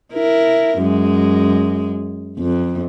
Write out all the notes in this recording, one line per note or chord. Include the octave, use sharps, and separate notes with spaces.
E4 A#4
F#2 G#3
F2